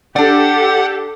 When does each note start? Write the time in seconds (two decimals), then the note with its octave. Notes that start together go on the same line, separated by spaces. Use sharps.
0.16 D4 G4 A4 D5 F#5